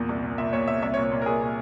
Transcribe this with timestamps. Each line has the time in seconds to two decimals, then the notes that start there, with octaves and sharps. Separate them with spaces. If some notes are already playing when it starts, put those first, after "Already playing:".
Already playing: E2 A#2
0.09 C2
0.24 A#2
0.38 A#2 E5
0.53 A#2 C#5
0.68 A#2 E5
0.82 C2 E5
0.94 C#5
0.97 A#2
1.04 C#5
1.11 A#2
1.22 A#4
1.26 A#2 G#4
1.41 A#2